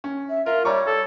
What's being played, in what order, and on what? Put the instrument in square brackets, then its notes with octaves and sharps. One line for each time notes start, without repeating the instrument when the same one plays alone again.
[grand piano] C#4
[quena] E5
[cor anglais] F4 [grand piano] A#4 [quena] E5
[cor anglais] G3 [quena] C#5 [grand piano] D5 A#5 C#6
[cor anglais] A4